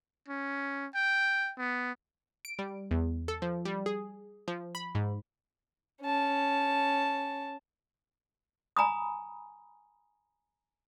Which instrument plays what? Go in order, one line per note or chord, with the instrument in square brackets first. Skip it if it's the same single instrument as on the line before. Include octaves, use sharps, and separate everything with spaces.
[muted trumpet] C#4
G5
B3
[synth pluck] D7
G3
E2
A4
F3
G3
G#4
F3
B5
G#2
[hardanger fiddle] C#4 A5
[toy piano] G#5 A#5 B5 D#6